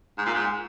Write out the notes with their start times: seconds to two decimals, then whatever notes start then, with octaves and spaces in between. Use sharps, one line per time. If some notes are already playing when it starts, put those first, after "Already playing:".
0.18 G#2
0.26 A#2
0.34 G#2